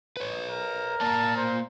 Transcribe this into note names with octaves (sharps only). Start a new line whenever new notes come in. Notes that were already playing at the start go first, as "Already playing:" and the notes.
B4 C#5
A#4
A#3 D5 A5 A#5
C5